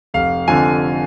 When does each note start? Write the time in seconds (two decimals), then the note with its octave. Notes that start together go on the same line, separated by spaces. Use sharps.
0.14 F1 F5
0.48 F2 D3 F3 G#5